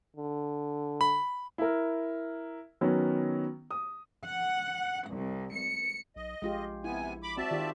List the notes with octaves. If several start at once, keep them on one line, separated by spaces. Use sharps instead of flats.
D3
B5
E4 A#4
D#3 F#3 B3 C#4
D#6
F#5
C2
C#7
B1 D#5
A#1 G#3 F4 G4
C3 B3 E4 G#5
B5 D6
C4 F#4 D5 E5 A5
D#3 F4 G4